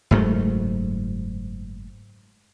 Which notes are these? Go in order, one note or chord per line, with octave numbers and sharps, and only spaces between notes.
F#1 G#2 F#3 A3